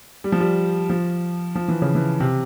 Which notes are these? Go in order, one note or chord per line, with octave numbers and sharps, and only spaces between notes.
G3
F3
G3
F3
F3
E3
C#3
E3
C3